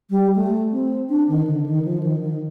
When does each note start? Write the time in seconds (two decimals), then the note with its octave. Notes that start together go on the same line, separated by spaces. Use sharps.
0.10 G3
0.35 A3
0.72 C4
1.09 D4
1.28 D#3
1.47 D3
1.66 D#3
1.85 F3
2.03 D#3
2.22 D#3